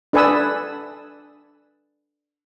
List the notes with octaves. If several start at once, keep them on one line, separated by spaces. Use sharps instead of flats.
D4 A4 B4 G#5 D#6 E6